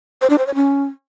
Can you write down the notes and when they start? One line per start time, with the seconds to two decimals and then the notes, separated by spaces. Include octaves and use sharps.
0.21 C5
0.30 D4
0.38 C5
0.46 C#5
0.55 C#4